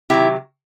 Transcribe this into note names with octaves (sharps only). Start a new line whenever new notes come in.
C3 D#3 F#3 E4 G4